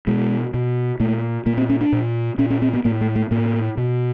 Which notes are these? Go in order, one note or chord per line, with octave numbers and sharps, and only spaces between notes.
B2 G#3
B2
A#2 A3
A#2 A#3
C4
C#4
D4
A#2
A#2 C#4
C#4
C4
B3
A2 A#3
A3
A3
A2 A#3
B2